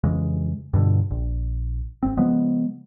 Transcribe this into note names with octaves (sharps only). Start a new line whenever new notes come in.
F2 C#3 E3 G#3
G2 B2 D3
A#1
G#1 C4
C#3 F3 G#3 B3